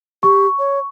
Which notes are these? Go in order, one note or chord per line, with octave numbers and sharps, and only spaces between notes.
G4 C#6
C#5